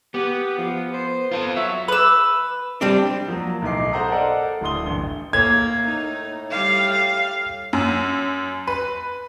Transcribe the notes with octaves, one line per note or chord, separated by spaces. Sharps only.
B3 G4
F3
C5
F4 A4
F#3 E5
B4 E6
G3 C4 D4
F3 F#3 A#3
B1 A2 D#4 D6 C7
A4 C5 F#5 A5 A#5 D#6
A4 A#4 D5 D#5 F#5
D1 A2 D3 C6 D#6 G7
A1 G2
A2 A#3 G#6
D#4
G3 F5
F5
F#2
B4